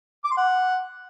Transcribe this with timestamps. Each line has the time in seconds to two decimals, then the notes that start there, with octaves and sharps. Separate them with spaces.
0.25 D6
0.31 C6
0.37 F#5